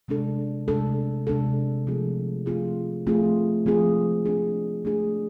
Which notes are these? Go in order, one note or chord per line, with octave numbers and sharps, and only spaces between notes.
C3 G#3 D4 A4
C3 G#3 D4 A4
C3 G#3 D4 A4
F3 A3 C4 F4 G#4
F3 A3 C4 F4 G#4
F3 A3 C4 F4 G#4
F3 A3 C4 F4 G#4
A3 D4 G#4
A3 D4 G#4